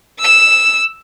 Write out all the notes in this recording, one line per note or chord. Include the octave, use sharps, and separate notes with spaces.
E6 E7